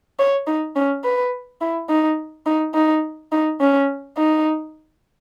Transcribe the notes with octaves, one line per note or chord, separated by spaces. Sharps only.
C#5
D#4
C#4
B4
E4
D#4
D#4
D#4
D#4
C#4
D#4